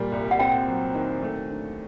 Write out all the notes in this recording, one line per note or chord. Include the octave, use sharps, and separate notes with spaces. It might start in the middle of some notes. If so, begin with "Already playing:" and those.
Already playing: A#2 G3
C2
F#5
C4 G5
F#3
D#3
A3
D3